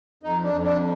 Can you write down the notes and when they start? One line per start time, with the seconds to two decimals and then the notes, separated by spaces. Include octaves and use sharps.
0.23 F2 D#4
0.43 D4
0.53 F2
0.64 D4